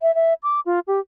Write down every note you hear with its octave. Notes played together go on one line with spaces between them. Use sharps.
E5
E5
D6
F4
G4